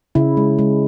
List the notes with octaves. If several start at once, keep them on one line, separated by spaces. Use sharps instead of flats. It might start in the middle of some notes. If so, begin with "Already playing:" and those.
C#3 E4
G#3
G#3